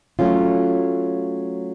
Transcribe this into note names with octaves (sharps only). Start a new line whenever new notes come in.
F#3 A3 C#4 F4